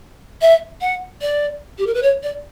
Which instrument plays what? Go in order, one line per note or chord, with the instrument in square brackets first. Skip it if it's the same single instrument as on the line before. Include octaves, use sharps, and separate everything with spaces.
[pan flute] E5
F#5
D5
G4
A#4
B4
C#5
D5